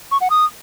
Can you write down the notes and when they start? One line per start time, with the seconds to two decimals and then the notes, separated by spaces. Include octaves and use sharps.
0.12 C#6
0.21 F#5
0.30 D#6